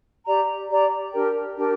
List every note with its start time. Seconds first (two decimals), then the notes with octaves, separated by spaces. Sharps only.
0.26 G4 D5 A#5
0.69 G4 D5 A#5
1.13 D4 G4 A#4 G5
1.57 D4 G4 A#4 G5